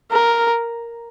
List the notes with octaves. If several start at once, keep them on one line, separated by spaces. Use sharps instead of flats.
A#4